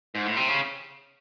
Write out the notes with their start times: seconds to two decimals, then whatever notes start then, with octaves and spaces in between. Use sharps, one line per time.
0.15 G#2
0.26 A2
0.37 C3
0.48 C#3